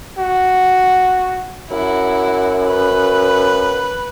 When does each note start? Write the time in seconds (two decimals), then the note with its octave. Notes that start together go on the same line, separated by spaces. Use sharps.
0.18 F#4
1.71 F#2 E4 F#4
2.67 B4